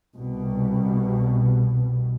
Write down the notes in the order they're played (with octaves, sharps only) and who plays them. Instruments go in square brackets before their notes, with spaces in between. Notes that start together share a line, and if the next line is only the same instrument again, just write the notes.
[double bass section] C2 B2